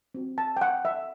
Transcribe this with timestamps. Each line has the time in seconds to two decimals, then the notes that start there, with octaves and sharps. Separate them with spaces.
0.14 C4 F#4
0.38 A5
0.57 G5
0.61 F#5
0.85 E5